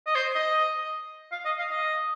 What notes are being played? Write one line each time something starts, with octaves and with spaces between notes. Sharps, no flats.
D#5
C5
D#5
F5
D#5
F5
D#5